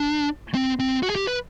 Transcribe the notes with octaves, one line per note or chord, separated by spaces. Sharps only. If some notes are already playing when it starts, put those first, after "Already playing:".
Already playing: D4
C4
C4
F#4
G#4
G4
B4